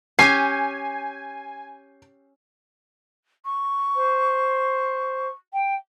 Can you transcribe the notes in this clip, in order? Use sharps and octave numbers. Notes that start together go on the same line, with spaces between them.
C#4 G4 G#5 C7
C#6
C5
G5